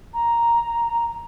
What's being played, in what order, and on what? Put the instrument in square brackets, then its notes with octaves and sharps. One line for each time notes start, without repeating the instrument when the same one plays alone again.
[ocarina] A#5